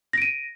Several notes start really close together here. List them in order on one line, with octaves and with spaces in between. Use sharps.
A#6 D7 D#7